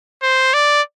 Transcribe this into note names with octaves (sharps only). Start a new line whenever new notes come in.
C5
D5